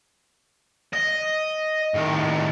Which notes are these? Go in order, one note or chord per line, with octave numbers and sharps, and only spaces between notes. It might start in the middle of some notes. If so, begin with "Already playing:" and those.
D#5
A2 D#3